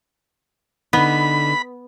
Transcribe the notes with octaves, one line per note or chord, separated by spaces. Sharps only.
D3 B3 D#4 B5